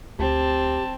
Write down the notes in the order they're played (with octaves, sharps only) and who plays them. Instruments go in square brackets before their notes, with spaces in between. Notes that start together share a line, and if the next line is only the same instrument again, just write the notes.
[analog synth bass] D2 [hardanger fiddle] C4 [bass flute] G4 [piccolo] A5